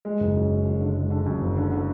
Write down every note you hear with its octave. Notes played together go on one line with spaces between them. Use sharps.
G#3
F#1
F#2
F#1
F#2
D3
G#3
D3
F#2
F#1
D3
D3